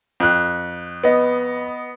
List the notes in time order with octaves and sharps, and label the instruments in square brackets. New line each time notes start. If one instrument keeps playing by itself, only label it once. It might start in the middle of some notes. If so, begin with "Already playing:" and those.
[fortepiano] F2 F#6
[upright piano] B3 D#5